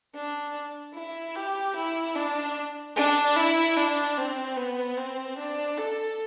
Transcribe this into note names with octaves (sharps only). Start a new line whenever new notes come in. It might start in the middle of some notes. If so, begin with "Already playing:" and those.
D4
E4
G4
E4
D4
D4
E4
D4
C4
B3
C4
D4
A4